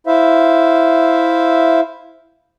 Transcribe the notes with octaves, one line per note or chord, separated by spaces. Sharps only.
E4 C5 E5 F5